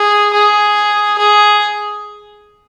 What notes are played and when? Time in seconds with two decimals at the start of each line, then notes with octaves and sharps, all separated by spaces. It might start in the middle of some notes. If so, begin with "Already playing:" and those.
Already playing: G#4
0.33 G#4
1.18 G#4